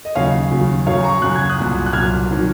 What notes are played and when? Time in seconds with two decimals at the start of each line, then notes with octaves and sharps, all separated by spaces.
0.05 D#5
0.15 D#2 C#3 F#3 C#5 F5
0.51 D#2 C#3 F#3
0.86 F#2 C#3 F#3 C#5 F5
1.04 A#5 C#6
1.22 F#2 C#3 F#3 F#6
1.36 G#6
1.50 D#6 F#6
1.58 C2 A#2 F#3
1.86 F#6
1.93 C2 A#2 F#3 F6 G#6
2.30 C3 D#3 F#3